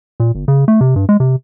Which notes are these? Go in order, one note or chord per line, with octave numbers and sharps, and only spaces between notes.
A#2
G1
C#3
A3
C3
G2
G#3
C3